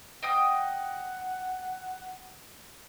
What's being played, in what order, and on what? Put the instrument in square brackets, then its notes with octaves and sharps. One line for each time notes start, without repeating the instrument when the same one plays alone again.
[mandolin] D#5 G5 D#6 [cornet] F#5